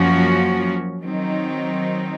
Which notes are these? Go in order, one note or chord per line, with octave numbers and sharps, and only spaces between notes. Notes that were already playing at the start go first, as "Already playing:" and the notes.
Already playing: F#2 F3 A#3 C#4 F#4
D#3 F#3 C4 D#4